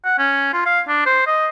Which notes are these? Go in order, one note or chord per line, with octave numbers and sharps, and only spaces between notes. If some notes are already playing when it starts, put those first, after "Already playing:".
F#5
C#4
F4
F5
D4
C5
D#5